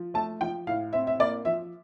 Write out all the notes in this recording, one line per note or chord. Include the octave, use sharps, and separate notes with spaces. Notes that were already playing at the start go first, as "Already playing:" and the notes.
Already playing: F3
A3 A5
F3 G5
A2 F5
C4 E5
E5
A#3 D5
F3 E5